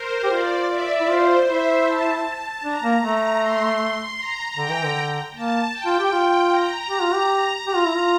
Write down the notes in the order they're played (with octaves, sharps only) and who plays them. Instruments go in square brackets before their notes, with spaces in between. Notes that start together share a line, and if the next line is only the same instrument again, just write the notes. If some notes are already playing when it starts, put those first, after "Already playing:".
Already playing: [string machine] A#4 C5
[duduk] G4
[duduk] F4 [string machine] D5
[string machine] E5
[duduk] E4
[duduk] F4 [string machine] C5
[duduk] E4 [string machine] E5
[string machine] A5
[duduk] D4 [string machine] A#5
[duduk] A#3
[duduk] A3 [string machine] A#5
[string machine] C6
A#5
[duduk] D3 [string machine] G5
[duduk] E3
D3
[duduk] A#3 [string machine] A5
[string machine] G5
[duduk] F4
G4
F4
[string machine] A#5
[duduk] G4 [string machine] A#5
[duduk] F4
G4
[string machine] A#5
[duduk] G4
F4
E4
F4